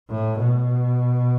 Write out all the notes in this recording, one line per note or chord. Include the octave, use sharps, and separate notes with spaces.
A2
B2